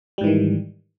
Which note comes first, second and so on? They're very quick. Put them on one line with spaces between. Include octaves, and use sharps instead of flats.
G3 G#2 E3 D#3